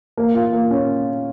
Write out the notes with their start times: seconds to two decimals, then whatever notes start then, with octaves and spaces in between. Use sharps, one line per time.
0.17 A#3
0.35 F4
0.53 A#3
0.71 C#4